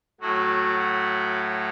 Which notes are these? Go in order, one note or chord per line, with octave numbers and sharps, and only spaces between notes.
A2 F#3 A3 F#4
F#4